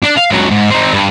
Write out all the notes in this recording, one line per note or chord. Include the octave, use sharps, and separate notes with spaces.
D4
F5
C#2 F#3
G#2
C4 D#4
G2